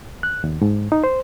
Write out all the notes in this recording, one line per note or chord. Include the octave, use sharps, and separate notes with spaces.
F#6
D#2
G#2
D#4
C5